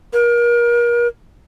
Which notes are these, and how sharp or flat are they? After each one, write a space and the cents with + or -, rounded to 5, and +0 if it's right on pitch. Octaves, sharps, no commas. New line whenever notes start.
A#4 +35